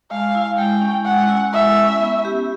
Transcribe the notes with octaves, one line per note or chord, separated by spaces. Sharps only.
G#3 F5
E4
G#3 G5
C#4
G#3 F#5
E4
G#3 E5
C#4
B3
G4